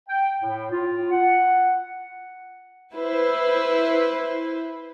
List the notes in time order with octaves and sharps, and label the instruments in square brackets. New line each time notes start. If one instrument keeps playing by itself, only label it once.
[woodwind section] G5
A2
F4
F#5
[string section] E4 B4 C5